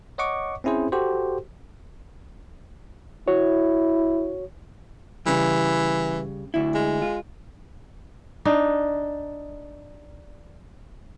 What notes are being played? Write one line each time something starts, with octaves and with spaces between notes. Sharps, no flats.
C#5 D#5 F#5 C#6 D6
C4 C#4 E4 G#4 C5
F#4 G4 A4 C5
E4 F#4 C#5
C#3 E3 G3
D2 E4
G#3
F4
D4 D#4